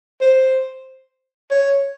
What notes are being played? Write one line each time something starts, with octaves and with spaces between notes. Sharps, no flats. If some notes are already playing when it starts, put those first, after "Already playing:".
C5
C#5